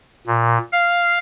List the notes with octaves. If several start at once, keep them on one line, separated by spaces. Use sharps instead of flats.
A#2
F5